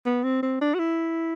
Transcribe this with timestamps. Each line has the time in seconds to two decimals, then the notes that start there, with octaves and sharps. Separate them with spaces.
0.06 B3
0.23 C4
0.43 C4
0.61 D4
0.74 F#4
0.79 E4